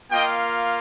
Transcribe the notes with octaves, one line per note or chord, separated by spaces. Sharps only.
A#3 F4 D#5 G5